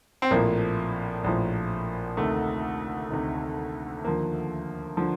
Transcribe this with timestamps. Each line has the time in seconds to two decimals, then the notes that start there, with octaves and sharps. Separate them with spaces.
0.22 C4
0.31 A#1 A2 F3 A#3
1.24 A#1 A2 F3
2.17 D2 C3 D#3 A3
3.10 D2 C3 D#3
4.04 D#2 D3 F3 A#3
4.97 D3 F3